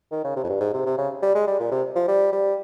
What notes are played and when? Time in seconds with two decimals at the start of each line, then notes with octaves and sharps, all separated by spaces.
0.11 D#3
0.24 C#3
0.36 C3
0.44 F2
0.49 G2
0.61 G#2
0.74 C3
0.86 C3
0.98 C#3
1.23 G3
1.35 G#3
1.47 G3
1.60 A#2
1.71 C3
1.96 F3
2.08 G3
2.33 G3